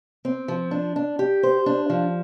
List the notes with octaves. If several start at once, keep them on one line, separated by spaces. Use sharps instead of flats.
C4
F3
D4
D4
G4
C5
D4
F3